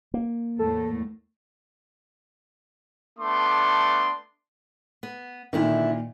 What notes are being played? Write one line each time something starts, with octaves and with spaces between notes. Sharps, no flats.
A#3
E2 A2 A3 A4
A3 B3 D4 C6 D6
B3
A#2 D3 D#3 D4 E4